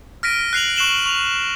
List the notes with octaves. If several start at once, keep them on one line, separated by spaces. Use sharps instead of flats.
F6 A#6 B6 D7 D#7
F#6 C7 F7 F#7
C#6 F#6 C7 E7 F#7 G7
C#6 F7